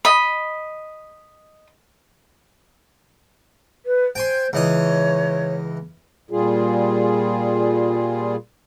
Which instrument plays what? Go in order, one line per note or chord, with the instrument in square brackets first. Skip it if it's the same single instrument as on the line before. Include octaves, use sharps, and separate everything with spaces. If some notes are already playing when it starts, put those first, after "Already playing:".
[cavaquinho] D#5 B5
[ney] B4
[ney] C5 [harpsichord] G5 G#5 C6
[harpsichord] C#2 E3 D#5 [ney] C#5
[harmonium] A#2 G3 F4 G#4